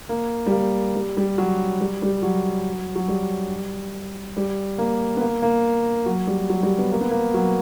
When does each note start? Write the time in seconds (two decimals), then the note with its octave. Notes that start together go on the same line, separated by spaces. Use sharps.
0.09 A#3
0.46 G3
0.52 A#3
0.96 G3
1.17 G3
1.38 F#3
1.81 G3
2.02 G3
2.22 F#3
2.96 F#3
3.08 G3
4.37 G3
4.78 A#3
5.16 B3
5.21 A#3
5.42 A#3
6.06 F#3
6.27 G3
6.50 F#3
6.63 G3
6.78 B3
6.92 A#3
7.01 B3
7.11 A#3
7.34 F#3